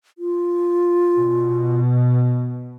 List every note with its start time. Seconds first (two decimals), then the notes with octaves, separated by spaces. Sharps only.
0.18 F4
1.17 B2